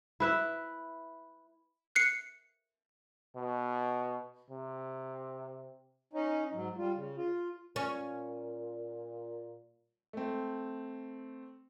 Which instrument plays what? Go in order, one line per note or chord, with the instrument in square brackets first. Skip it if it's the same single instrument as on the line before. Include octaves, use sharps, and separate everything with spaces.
[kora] E4 B4 E5
[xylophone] F#6 C7 C#7
[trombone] B2
C3
[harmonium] C#4 D#4
G#2 F#3
G3 F4
C#3
F4
[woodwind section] A#2 [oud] C#4
[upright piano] A3 C4